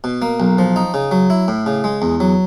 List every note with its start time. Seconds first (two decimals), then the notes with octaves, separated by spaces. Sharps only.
0.04 B2
0.22 A#3
0.40 B1
0.58 F3
0.76 D#4
0.94 C#3
1.11 F#3
1.30 E4
1.48 A2
1.66 C#3
1.84 G#3
2.02 E2
2.20 F#3